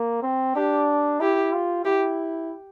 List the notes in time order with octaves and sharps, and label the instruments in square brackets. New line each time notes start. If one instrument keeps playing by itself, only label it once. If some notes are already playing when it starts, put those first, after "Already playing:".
Already playing: [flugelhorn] A#3
C4
[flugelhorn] D4 [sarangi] G4
[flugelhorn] E4 [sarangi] G4
[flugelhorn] F4
[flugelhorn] E4 [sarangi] G4